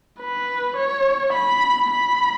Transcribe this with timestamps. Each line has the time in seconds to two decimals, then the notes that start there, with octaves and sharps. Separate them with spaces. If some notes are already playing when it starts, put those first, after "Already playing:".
0.21 B4
0.77 C#5
1.34 B5
1.90 B5